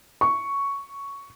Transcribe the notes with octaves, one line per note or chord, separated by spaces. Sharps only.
C#6